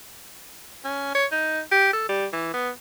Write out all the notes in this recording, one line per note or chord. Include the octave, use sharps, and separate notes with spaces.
C#4
C#5
D#4
G4
A4
G3
E3
B3